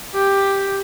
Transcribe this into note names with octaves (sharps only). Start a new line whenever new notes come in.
G4